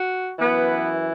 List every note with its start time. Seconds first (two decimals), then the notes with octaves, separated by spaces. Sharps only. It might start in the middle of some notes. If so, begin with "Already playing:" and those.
Already playing: F#4
0.39 F#2 E3 B3